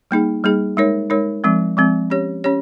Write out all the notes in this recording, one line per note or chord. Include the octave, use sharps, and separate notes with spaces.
G3 A#3 D#4 G#4
G3 A#3 D#4 G#4
G#3 D#4 A#4 C#5
G#3 D#4 A#4 C#5
F3 G#3 C4
F3 G#3 C4
C#4 G4 C#5
C#4 G4 C#5